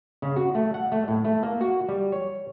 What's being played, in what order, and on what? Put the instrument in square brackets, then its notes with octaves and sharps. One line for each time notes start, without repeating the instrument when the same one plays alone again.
[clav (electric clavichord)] C#3
F#4
A3
F#5
A3
A2
A3
A#3
F#4
G3
C#5